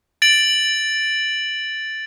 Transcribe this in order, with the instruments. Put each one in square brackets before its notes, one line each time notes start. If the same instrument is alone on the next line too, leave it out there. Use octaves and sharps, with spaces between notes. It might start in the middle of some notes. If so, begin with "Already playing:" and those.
[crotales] A6 D7 F#7